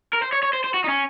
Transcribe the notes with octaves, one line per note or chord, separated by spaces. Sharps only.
A#4
C5
C#5
C#5
C5
C5
F#4
D#4
C#4